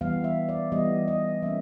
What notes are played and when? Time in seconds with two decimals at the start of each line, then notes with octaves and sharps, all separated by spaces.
0.01 E3 G3 B3 F5
0.24 E5
0.49 D5
0.72 E3 G3 B3 D#5
1.08 D#5
1.42 E3 G3 A#3 C#4 E5